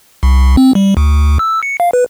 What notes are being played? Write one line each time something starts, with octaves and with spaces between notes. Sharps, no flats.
C2
C4
G3
D2
E6
C#7
F5
B4